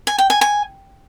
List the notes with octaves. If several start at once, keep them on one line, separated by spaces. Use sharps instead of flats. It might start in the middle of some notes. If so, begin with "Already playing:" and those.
G#5
G5
G#5
G#5